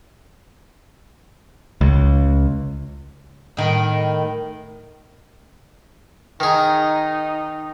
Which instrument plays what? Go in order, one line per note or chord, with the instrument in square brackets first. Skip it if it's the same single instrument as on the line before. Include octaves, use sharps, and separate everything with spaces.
[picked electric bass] C#2
[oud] A2 D#3
[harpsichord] D#3 G#4 [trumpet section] D#4